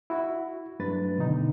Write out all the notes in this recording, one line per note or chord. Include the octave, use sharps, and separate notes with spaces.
E4 F#4
G2 F#3 A3 D4 B4 A6
B2 D3 D#3 D#4